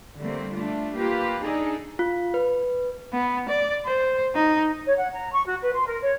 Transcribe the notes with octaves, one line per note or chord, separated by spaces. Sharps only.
D3 G3 A3 A#3 C4
A3 D4 F4
A#3 F4 G4 B4
D4 D#4 G#4 A4
F4
B4
B3
D5
C5
D#4
C#5
F#5
A#5
C#6
F#4
B4
C6
A#4
C#5